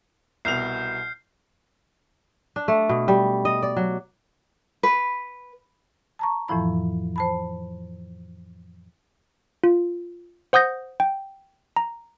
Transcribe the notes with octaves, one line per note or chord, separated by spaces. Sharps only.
C2 B2 F6 G6 C7 F7
D4
A3
B2
G3
D#5
D5
F#3
B4
A5 A#5 C#6
F2 A2 E3 F3 E4 B5
C5 A5 B5
F4
C5 F#5 D#6 G6 A#6
G5
A#5